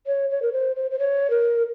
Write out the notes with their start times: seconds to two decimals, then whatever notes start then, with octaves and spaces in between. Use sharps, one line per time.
0.07 C#5
0.30 C#5
0.42 A#4
0.53 C5
0.76 C5
0.91 C5
0.99 C#5
1.30 A#4